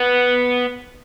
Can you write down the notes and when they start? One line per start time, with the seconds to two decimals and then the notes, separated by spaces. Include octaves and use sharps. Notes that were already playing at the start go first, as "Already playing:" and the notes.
Already playing: B3